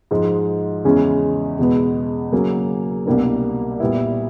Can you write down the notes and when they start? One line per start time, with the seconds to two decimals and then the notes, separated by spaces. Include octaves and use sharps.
0.11 G#2 F3 G#3
0.84 E2 C#3 E3 G#3 C#4
1.59 E2 B2 G#3 B3
2.32 C#3 F#3 A#3 C#4
3.06 C2 B2 G3 A#3 D4
3.80 A#2 G3 B3 E4